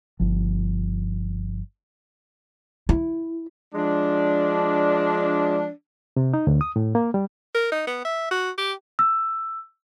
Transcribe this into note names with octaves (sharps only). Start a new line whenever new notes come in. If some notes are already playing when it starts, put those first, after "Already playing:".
G1 F3
E4
F3 G#3 D4
C3
D#4
D2
D#6
A2
A#3
G3
A#4
D#4
B3
E5
F#4
G4
E6